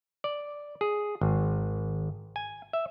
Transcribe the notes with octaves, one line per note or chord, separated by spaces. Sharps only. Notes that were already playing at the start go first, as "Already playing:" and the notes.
D5
G#4
G#1
G#5
E5